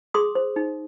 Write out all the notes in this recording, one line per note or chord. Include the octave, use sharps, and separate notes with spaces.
G#4 C6 D#6
C5
D#4